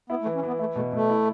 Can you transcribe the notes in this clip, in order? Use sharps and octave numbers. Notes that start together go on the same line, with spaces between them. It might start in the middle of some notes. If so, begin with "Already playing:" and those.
B3 E4
A3
E3
C#4
E3 B3
A3 E4
B2 A3
B2 A3
E4